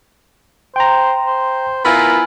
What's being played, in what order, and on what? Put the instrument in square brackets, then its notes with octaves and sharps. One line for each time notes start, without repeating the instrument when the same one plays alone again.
[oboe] C5 [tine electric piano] G5 A#5
[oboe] C5
[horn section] B3 E4 F4 [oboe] A#4 [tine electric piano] G#5 B5